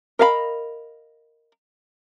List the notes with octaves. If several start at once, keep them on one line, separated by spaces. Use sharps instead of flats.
A#4 D#5 F5 G#5 B5